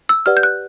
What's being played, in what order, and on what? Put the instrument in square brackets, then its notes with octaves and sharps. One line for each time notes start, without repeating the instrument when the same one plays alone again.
[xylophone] E6
G4 B4 D5 F#5 F6
G6
F#6